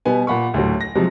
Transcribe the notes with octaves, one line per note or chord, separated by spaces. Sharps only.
B2 G3 B3 G#5
A#2 F#5 B5 C#6
D2 A2 F#3
A#6
C3 F3 F#3 G#3